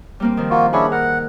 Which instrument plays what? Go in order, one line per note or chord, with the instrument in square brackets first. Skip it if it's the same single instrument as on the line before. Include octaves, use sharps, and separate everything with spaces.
[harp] G3 A#3 C4
D#3 F3
[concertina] A#3 F4 F#4
[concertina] C#4 D4 E4 [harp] G#4 F#5
[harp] A#4 [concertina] F#5